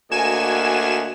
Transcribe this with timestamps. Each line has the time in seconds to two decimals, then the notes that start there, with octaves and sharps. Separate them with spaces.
0.11 D2 A#3 F#4 D#5 G#5 E7